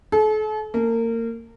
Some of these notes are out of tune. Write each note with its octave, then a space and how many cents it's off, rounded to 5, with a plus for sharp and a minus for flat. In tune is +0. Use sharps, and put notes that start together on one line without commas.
A4 -40
A#3 -30